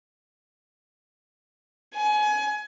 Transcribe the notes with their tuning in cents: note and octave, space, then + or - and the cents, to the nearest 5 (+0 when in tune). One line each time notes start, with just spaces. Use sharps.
G#5 +25